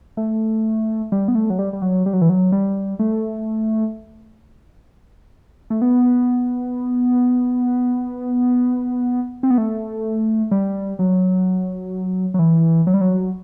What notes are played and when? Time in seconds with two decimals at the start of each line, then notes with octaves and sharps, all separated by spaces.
0.17 A3
1.12 G3
1.28 B3
1.35 A3
1.50 F#3
1.59 G3
1.73 G3
1.82 F#3
2.06 G3
2.13 F#3
2.21 E3
2.29 F#3
2.52 G3
2.99 A3
5.70 A3
5.82 B3
9.43 C4
9.50 B3
9.58 A3
10.51 G3
10.99 F#3
12.34 F#3
12.39 E3
12.87 F#3
12.94 G3
13.01 F#3